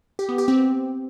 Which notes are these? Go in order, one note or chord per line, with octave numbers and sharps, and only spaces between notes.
G4
B3
G4
C4